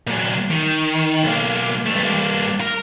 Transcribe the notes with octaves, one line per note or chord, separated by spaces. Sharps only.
A#2 F#3
D#3
B1 A#3
G2 A3
G2 A#3
A#4